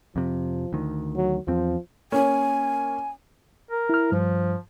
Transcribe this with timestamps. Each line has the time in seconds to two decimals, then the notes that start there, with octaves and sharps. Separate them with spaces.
0.16 F2 C3 F3
0.73 D2 D#3
1.16 F#3
1.48 E2 F3 C4
2.12 A#3 C#4 G#5
3.70 A#4
3.89 E4 F6
4.12 G2 F3